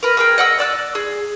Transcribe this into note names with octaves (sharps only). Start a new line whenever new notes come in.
A#4 B4
G#4 A#4 G5
D#5 F#5 E6
D5 E6 F#6
G#4